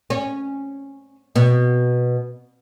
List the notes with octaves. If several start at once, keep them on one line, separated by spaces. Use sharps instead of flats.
C#4
B2